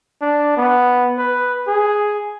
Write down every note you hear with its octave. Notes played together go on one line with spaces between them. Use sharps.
D4
B3
B4
G#4